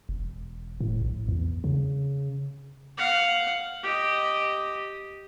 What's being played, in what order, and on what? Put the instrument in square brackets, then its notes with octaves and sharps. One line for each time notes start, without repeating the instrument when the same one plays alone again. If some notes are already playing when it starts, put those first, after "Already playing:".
[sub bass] E1
A2
A#1
E2
C#3
[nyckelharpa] F5 F#5
G4 D#5